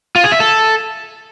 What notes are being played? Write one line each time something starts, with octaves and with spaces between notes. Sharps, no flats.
F4
G#4
E5
A4